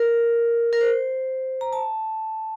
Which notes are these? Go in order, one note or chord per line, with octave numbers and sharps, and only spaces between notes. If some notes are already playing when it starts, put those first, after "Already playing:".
Already playing: A#4
A#4
C5
A#5
A5